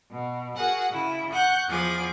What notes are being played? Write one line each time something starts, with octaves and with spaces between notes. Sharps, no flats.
B2
F#4 G#4 A#4 F#5 G#5
C#3 E4
F#5 C#6 F#6 G6
E2 F3 G#4 D6